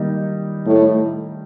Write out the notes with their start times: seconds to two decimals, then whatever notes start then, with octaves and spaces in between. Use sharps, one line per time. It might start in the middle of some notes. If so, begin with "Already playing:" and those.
Already playing: D#3 G3 A#3 D#4
0.65 A2 A3